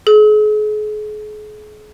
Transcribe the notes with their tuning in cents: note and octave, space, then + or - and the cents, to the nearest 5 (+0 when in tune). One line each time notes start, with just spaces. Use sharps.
G#4 +40